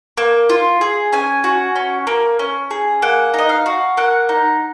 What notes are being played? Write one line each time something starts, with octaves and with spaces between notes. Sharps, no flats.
A#3
F4
G#4
C#4 G#5
F#4
C#4
A#3
C#4
G#4
A#3 F#5
D#4 D#5
F5
F#4
A#3 F#5
D#4